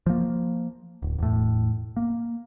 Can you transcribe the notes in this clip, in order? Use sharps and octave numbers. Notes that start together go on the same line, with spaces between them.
F3 A#3
D1
E1 A2
A#3